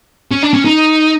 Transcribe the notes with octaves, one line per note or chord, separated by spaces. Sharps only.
C#4
D4
C#4
D#4